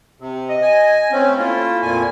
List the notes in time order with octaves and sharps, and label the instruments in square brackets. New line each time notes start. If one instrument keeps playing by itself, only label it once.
[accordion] C3
[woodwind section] D#5
[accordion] G#5
[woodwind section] G2 A3 E4 [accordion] C4 C#4
[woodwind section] A3 A#3 E4 [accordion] F4
[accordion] F2 A#2 G#5